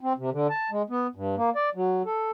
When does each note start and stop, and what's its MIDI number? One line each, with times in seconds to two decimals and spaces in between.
0.01 0.13 60
0.18 0.30 48
0.32 0.47 50
0.50 0.70 81
0.71 0.82 56
0.90 1.07 59
1.15 1.35 43
1.37 1.50 58
1.56 1.69 74
1.75 2.02 54
2.06 2.31 69